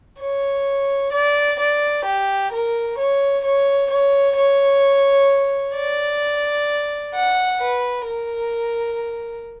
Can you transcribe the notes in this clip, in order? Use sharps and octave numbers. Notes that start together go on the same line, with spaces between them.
C#5
D5
D5
G4
A#4
C#5
C#5
C#5
C#5
D5
F#5
B4
A#4